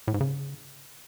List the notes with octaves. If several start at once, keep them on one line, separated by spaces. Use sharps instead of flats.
A2
G#2
C#3